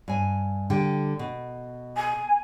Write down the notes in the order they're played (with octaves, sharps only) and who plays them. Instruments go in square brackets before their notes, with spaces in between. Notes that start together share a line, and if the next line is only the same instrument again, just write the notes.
[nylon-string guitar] G2 G#5
D3 G3 G5
B2
[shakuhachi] G#5